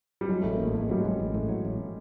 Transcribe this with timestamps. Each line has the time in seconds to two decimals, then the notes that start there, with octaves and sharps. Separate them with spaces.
0.21 G3
0.29 F#3 G#3
0.41 A1 A3
0.52 A#3
0.60 A1 A3
0.74 A2 A3
0.82 G#3
0.90 F#3 G3
1.00 A1 G#3
1.19 A1
1.34 A2
1.49 F#3
1.65 A1